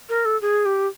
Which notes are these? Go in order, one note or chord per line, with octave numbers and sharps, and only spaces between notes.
A#4
A4
G#4
G4